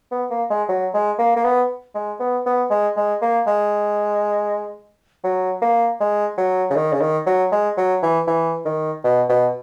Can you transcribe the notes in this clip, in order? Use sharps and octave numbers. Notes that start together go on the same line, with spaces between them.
B3
A#3
G#3
F#3
G#3
A#3
A#3
B3
G#3
B3
B3
G#3
G#3
A#3
G#3
F#3
A#3
G#3
F#3
C#3
D#3
C#3
D#3
F#3
G#3
F#3
E3
E3
D#3
B2
B2